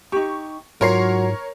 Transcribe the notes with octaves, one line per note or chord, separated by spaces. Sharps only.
D#4 G4 C#6
G#2 F#3 F4 A#4 C#5 C7